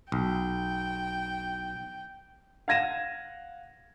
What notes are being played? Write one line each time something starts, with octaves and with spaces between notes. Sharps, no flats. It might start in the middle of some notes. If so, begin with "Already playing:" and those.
B1 G5
F5 F#5 G#6 A#6 D#7 E7